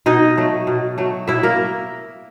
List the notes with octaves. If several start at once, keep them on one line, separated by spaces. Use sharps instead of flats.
B2 D#4 D#5
F#3 A3
B2
F#3 A3
B2 E4 E5
A#3 A#4